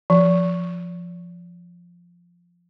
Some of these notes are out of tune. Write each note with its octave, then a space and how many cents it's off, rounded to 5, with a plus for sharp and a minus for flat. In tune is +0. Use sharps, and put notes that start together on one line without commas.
F3 +0